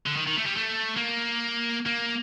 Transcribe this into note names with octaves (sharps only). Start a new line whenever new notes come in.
D3
D#3
D#3
A3
G3
A3
A#3
A#3